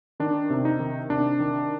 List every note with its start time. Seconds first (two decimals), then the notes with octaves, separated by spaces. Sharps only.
0.20 D#3 D4
0.50 C3
0.65 D#4
0.80 D#3
1.10 C3 D4
1.40 D#3